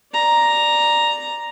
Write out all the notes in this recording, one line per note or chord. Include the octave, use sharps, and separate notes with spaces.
D5 A#5